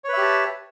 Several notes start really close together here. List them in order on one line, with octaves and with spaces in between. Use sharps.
C#5 B4 E5 G4 A5